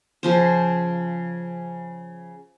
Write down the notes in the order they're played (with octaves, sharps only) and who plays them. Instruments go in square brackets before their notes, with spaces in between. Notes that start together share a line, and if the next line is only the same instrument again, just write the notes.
[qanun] C#3 F3 C5